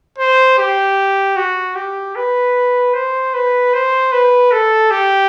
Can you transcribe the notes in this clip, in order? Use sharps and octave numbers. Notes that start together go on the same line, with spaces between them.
C5
G4
F#4
G4
B4
C5
B4
C5
B4
A4
G4